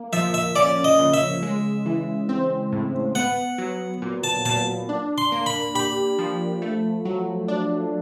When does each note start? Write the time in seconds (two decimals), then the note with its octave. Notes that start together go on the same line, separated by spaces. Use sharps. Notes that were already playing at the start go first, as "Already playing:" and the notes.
Already playing: A#3
0.13 F3 E5
0.34 E5
0.56 C#4 D5
0.84 D#5
0.99 C#3
1.14 E5
1.43 G#3
1.86 E3
2.29 C4
2.72 A2
3.15 B3 F#5
3.58 F#3
4.02 A#2
4.24 A5
4.45 A#2 A5
4.89 D4
5.18 C6
5.32 A#3
5.46 B5
5.75 G4 B5
6.19 F3
6.62 A3
7.05 F#3
7.48 D4